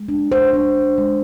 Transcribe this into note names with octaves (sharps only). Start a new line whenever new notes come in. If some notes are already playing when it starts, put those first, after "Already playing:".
Already playing: G#3
D4
C5
D4
G#3